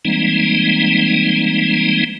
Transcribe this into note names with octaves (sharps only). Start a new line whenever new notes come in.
E3 G3 G#3 A#3 C4 D#4